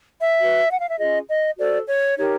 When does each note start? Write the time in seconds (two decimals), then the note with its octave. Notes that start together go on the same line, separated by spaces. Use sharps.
0.20 E5
0.40 F#4 B4
0.71 F#5
0.80 F5
0.90 E5
0.99 C#4 F4 G#4 D#5
1.29 D#5
1.58 F#4 A4 C5 D5
1.88 C#5
2.17 D#4 G4 A#4 C#5